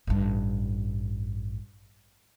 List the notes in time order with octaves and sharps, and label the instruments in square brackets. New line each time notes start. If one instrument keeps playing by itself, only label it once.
[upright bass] A1 G2